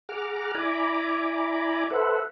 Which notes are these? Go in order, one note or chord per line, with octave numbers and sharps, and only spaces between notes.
G#4 F#5 A#5 D6 F6
E4 D5 G#5 A#5 B5 D6
A4 B4 C5 E5 F#5